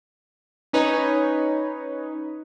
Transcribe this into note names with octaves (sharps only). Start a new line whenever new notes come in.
C#4 D#4 B4 C#5